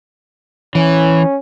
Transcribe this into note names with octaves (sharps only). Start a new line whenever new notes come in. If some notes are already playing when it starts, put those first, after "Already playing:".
E3 C#4